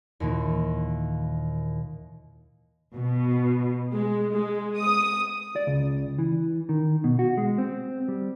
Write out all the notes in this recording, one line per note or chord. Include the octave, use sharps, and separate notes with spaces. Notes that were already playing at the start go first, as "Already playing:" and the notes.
D#2 A#2 E3
B2
G#3
G#3
D#6
D5
C#2
E3
D#3
B2
F#4
G#3
C4
G3